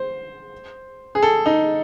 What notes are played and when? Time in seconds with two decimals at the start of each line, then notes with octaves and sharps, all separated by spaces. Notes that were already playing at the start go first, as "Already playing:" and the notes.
Already playing: C5
1.15 G#4
1.23 A4
1.46 D#4